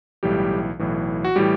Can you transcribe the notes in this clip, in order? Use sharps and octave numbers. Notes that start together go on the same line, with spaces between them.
B1 A2 E3 G3 G4
B1 A2 E3
F#4
A2 E3 G3 G4